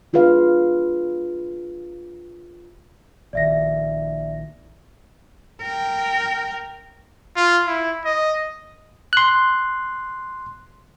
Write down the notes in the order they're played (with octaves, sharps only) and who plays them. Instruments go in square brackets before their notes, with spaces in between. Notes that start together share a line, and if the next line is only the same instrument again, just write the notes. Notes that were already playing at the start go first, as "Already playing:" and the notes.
[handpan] D4 F4 G#4 B4 F5
[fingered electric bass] A#1 D#3 [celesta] D5 E5 A#6
[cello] A#4 G5
[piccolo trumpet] F4
E4
D#5
[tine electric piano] C6 F#6